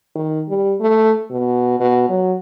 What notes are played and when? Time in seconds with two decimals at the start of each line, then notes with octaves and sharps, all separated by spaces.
0.16 D#3
0.48 G3
0.80 A3
1.31 B2
1.80 B2
2.09 F#3